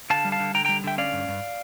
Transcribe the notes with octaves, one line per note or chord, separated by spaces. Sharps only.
D3 F5 A5
G3
F5 A5
D3
D3 G5 A#5
G3 G5 A#5
D3 E5 G5
C#4 D5 F5
G2
G2